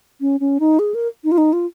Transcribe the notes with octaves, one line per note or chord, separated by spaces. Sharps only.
C#4
C#4
D#4
G#4
A#4
D#4
F4
D#4
F4